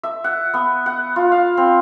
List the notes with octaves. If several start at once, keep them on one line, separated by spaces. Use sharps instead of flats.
E5
F#5
B3
F#5
F4
F5
C4